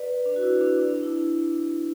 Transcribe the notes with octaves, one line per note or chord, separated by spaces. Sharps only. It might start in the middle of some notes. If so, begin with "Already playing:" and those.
Already playing: B4 D5
D4
F#4
E4
D4
E4
D4
E4